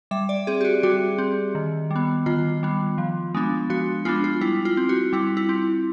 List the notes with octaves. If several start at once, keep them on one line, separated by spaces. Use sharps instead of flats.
G3 E5
D5
C4 G#4
G4
F#4
G3 F#4
C4
D#3
G3
B3
D#3 F4
G3 B3
F3
G#3 B3 D4
F3 F#4
G#3 B3 D4 F4
F4
G3 E4
F4
C4
F#4
G3 E4
E4
C4